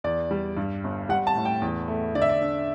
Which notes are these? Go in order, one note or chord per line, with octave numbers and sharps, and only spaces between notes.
E2 D5
G3
G2
G1
G3 F#5
A5
A2
G5
E2
A3
D3 D5
E5
D5
D4